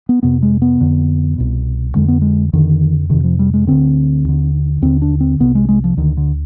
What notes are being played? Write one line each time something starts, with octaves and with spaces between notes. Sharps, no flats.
B3
F2 C3 B3
G#3
B3
F2 D3
C2 B2
F2 D3 G#3
B3
G#3
F2 D3 D#3
F2 C3 D#3
F3
G3
G#3
D2 D3 C4
D#2 D3
D#2 D3 C4
D4
C4
C2 C3 B3
G#3
G#3
F3
D2 D3 D#3
D3